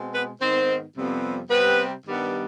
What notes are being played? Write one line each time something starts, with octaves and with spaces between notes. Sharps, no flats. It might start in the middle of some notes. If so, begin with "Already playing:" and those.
Already playing: B2 G#3 C4
B3 B4
G#2 D#3 B3 C4 C5
F2 C3 G3 B3
C3 G3 B3 C4 B4
G2 D#3 G3 B3